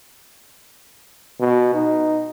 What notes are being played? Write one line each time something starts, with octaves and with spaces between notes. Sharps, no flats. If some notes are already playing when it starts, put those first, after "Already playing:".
B2
D#4